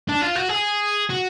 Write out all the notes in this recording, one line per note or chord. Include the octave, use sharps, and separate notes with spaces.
D4
F4
F#4
G#4
F#4